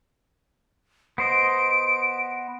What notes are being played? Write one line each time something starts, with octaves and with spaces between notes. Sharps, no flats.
B3 C5 D#5 D7